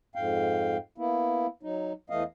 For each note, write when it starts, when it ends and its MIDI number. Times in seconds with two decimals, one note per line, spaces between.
0.15 0.77 41
0.15 0.77 44
0.15 0.77 77
0.15 0.77 79
0.98 1.47 58
0.98 1.47 59
0.98 1.47 64
1.63 1.93 54
1.63 1.93 63
2.10 2.23 40
2.10 2.23 52
2.10 2.23 57
2.10 2.23 75
2.10 2.23 77